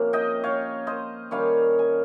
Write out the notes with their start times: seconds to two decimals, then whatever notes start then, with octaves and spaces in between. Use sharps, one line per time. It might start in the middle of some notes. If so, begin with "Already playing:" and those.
Already playing: C3 F3 A#3 C#4 F5
0.13 D#5 G5
0.44 C#5 F5
0.87 C5 D#5
1.31 D#3 G3 C#4 C#5 F5
1.79 G#5